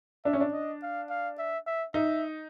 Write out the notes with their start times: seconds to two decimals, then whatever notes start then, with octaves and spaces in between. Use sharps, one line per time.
0.25 D4 E5
0.33 C#4
0.41 D4
0.53 D#5
0.82 F5
1.10 F5
1.39 E5
1.66 E5
1.94 D#4 E5